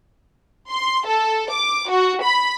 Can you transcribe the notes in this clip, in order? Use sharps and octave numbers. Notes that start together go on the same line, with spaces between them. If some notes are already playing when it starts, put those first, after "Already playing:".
C6
A4
D6
F#4
B5